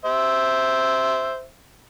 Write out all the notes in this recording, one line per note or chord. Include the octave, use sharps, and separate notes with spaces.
C5 E5